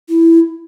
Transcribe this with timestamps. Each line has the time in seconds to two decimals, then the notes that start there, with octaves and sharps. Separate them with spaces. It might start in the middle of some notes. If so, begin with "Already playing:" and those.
0.09 E4